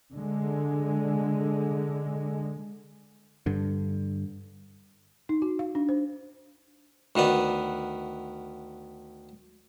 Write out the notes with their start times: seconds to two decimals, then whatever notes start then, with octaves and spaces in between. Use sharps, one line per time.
0.12 D3 G#3
3.46 G2 D3
5.29 D#4
5.42 F#4
5.59 F5
5.75 D4
5.89 C5
7.16 D2 D#3 B3 D5